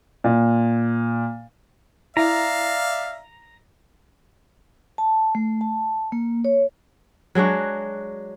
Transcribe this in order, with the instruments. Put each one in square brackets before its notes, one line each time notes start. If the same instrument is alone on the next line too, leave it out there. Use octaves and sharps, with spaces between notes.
[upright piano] A#2
[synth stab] E4 [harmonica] D5 E5 F5 [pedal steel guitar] A#5
[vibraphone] A5
A3
A5
A#3
C#5
[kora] F#3 G#3 D4 F#4